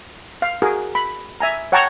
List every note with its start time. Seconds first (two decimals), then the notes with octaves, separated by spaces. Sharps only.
0.42 F5
0.62 F#4 G#4 A#4
0.95 B5
1.40 E5 G#5 A#5
1.72 C#5 F#5 G5 A5 A#5 C#6